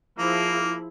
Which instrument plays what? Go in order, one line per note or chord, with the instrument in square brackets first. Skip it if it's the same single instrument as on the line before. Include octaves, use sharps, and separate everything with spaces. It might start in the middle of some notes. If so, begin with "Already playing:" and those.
[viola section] F3 E4 G#4 [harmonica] A#3